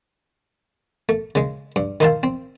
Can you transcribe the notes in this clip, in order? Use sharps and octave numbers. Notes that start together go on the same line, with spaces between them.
A3
C#3 G#3
G2
D#3 D#4 C5 F5 A5
C4